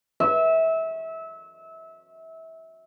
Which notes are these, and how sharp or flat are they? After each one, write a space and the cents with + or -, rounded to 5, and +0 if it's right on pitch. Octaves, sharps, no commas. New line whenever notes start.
E5 -25